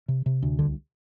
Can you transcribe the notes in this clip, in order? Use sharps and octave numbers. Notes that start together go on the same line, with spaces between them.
C3
C3
D2
C2 D3